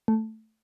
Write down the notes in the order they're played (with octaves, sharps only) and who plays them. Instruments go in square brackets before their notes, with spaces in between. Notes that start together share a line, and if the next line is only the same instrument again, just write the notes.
[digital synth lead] A3